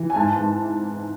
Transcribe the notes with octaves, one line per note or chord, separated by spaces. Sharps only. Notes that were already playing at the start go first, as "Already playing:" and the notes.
Already playing: E3
G#5
G#2 A5
G#2